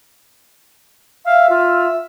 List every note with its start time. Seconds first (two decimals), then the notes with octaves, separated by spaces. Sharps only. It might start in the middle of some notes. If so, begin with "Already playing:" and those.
1.25 E5 F5
1.49 F4